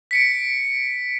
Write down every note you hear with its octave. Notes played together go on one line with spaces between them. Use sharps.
B6 C#7 D7